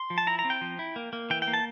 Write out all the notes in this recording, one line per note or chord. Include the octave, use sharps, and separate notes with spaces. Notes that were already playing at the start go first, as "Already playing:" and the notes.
Already playing: C6
F3
A5
E4 A#5
A#5
C4
G5
F3
E4
A#3
A#3
E3 G5
G5
A#3
A5